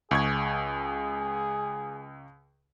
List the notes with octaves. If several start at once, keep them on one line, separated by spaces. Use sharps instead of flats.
C#2 G#4 C#6 G#6